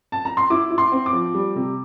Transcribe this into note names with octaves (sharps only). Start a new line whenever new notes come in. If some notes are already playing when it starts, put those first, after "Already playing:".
A5
A#5
C6
E4 D6
E4
C6
C4
D6
F3
G3
C3